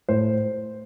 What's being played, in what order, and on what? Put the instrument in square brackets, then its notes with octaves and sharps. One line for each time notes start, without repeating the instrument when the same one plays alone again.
[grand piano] A2 C5